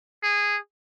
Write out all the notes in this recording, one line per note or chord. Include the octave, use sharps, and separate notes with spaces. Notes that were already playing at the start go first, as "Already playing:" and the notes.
G#4